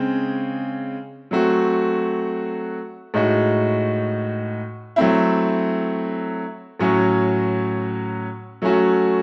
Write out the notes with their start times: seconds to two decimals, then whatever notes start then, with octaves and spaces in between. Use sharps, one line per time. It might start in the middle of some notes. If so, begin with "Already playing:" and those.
Already playing: C#3 G#3 C4
1.31 F#3 A3 C4 F#4
3.14 A2 G#3 D#4 F#4
4.96 F#3 A3 C4 E4
6.79 A2 F#3 C#4 F#4
8.62 F#3 A3 C#4 F#4